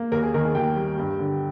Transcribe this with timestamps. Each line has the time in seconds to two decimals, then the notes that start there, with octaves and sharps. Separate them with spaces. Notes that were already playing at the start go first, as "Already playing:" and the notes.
Already playing: A#3
0.12 D#2 A#4
0.23 G#4
0.34 D#3 A#4
0.45 G#4
0.55 D#2 G5
0.76 G3
0.98 G2
1.19 D3